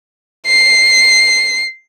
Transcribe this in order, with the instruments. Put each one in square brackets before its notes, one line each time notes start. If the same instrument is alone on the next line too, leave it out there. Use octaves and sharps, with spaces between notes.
[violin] C7